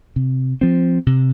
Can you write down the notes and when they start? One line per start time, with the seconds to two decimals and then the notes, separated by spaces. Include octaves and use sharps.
0.16 C3
0.61 F3 C4
1.06 C3